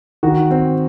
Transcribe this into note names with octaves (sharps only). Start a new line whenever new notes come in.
D#3 F#4
C4